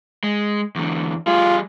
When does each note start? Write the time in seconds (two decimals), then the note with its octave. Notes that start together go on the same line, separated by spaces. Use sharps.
0.23 G#3
0.76 E2 D3
1.27 G3 F4 G#4